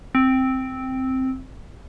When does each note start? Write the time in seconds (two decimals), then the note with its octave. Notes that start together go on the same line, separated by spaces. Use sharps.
0.15 C4